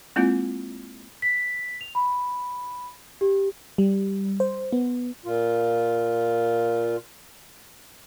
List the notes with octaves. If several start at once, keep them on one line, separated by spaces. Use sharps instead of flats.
G#3 A#3 C4 E4 F4
B6
F7
B5
G4
G3
C5
B3
A#2 F4